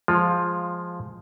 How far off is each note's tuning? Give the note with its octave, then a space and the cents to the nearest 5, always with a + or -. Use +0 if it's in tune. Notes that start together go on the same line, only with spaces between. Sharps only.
F3 +5 G#3 +0 F4 +15